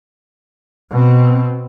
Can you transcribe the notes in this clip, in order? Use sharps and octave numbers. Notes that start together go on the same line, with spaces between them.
B2 C4